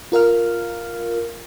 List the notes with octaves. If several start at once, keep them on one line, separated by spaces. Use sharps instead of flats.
F4 A#4 F5 F6